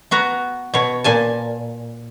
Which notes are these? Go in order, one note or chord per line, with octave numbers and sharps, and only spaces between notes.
B3 F#4 A#5
B2 C#5
A#2 G#5 A5